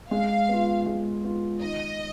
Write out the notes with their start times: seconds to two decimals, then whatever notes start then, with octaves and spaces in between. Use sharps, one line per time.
0.11 G#3 F5
0.49 B3 F4
0.86 G#3
1.24 B3 F4
1.62 D#3 D#5